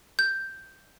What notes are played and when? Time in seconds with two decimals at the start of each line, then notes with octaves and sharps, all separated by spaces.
0.19 G6